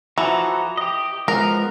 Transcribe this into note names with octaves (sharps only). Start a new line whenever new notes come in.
E3 F3 F#4 A4 A#5
G4 D#5
F3 G#3 B3 A#4